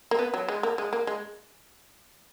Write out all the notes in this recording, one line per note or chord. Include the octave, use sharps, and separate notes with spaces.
A#3
B3
F#3
G#3
A#3
G#3
A#3
G#3